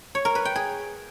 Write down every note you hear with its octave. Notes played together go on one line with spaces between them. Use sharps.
C#5
A#4
B4
G5
G#4